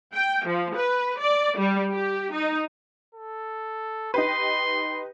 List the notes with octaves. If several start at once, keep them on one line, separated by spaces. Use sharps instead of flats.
G5
F3
B4
D5
G3
G4
D#4
A4
D#4 G4 B4 C6